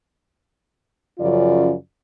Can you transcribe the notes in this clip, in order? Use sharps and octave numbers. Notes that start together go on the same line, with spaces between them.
F#2 C#3 F3 F4 D5